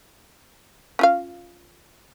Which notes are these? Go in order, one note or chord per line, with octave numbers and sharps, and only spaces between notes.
C#4 F4 F5